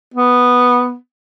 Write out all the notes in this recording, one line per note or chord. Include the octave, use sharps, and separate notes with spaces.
B3